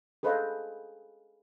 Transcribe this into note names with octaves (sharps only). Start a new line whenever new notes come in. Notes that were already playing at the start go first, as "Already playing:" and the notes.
G#4 A4 B4 C5 D#5 F5